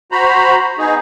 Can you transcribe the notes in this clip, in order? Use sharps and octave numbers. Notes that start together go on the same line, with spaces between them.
F#4 C5 A#5 B5
B3 D#4 G#4